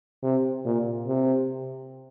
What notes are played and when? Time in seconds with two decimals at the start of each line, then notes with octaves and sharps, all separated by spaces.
0.23 C3
0.65 A#2
1.07 C3